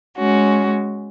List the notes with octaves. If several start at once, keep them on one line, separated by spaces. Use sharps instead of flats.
G#3 C#4 F#4